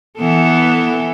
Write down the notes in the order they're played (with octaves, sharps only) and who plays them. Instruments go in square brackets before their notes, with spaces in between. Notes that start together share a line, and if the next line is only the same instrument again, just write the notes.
[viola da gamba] E3 B3 A4